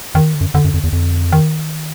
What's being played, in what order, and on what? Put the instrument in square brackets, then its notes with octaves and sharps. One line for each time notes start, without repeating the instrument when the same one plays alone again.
[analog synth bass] F2 [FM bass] D#3
[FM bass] D3
[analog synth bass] F#2
[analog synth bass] F2 [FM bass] D3
[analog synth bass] F#2
F2
E2
F2
[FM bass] D#3